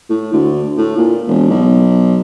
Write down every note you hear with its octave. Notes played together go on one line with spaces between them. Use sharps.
A2
D2
A2
A#2
E1
B1